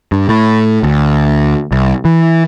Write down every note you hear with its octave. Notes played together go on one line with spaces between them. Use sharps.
G2
A2
D2
C2
E3